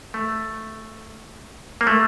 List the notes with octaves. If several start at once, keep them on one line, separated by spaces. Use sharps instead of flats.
A3
A#3
A3